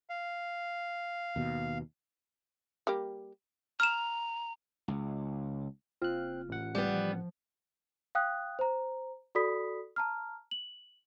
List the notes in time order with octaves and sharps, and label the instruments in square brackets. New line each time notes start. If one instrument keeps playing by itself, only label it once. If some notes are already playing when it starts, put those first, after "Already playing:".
[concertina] F5
[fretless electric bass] D#2 B2
[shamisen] G3 A#3 G4
[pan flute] A#5 [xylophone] F6 E7
[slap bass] C#2
[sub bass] F#1 [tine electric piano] C4 F#6 [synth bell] F4
[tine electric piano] A1 F#5
[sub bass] F#1 [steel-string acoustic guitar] G3 B3
[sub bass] F3
[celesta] F5 G5 D#6 F#6
C5 A#5
F#4 A4 D5 B5 D#6 B6
A5 A#5 F6
F#7